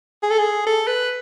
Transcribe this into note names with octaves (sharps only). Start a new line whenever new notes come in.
G#4
A4
G#4
A4
B4